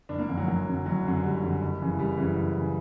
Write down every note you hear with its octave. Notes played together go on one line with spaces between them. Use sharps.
F#1 D4
A#3
F#2 D3
F#3
F#1 F#3
F#2 D3
F#1 F#3
F#2 D3
F#1 G3
F#2 D3
F#1
F#2 C#3 E3
F#1 G3
F#2 C#3 E3
F#1
C#3 E3